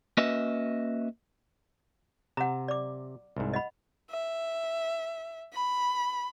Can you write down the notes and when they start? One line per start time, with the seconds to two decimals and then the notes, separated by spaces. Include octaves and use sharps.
0.17 A#3 C#4 F#4 B4 D#5 E5
2.37 C3 F#5 A#5
2.68 D5 D6
3.37 C2 G#2
3.53 D#5 F#5 B5
4.10 E5
5.53 B5